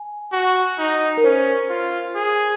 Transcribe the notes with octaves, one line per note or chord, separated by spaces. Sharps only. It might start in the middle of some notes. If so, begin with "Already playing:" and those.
Already playing: G#5
F#4
D#4
A#4
C#4 C5
F4
G#4